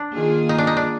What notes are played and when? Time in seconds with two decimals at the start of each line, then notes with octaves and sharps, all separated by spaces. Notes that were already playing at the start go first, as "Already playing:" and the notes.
Already playing: D4
0.12 D#3 A#3 F4 G#4
0.49 D#4
0.58 D4
0.67 D#4
0.77 D4